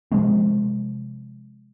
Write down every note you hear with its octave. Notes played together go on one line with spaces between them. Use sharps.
C3 F3 G#3 C4